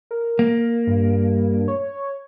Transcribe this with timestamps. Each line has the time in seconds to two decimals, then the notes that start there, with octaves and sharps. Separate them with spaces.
0.11 A#4
0.39 A#3
0.87 G2
1.68 C#5